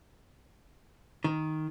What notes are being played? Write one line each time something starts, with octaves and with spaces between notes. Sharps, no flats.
D#3